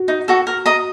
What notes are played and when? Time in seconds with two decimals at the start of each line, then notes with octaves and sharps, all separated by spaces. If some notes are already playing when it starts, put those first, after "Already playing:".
Already playing: F#4
0.08 D#4
0.28 F#4 A4
0.47 A#4
0.66 D#5 A#5